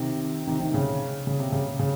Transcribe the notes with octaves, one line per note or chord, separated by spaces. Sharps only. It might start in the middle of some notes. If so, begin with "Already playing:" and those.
Already playing: C3 D#3
C3 D#3
C3 D#3
C#3
C#3
C3
C#3
C#3